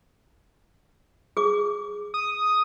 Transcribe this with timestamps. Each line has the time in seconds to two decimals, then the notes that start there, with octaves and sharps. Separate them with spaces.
1.37 G#4 D6
2.14 D#6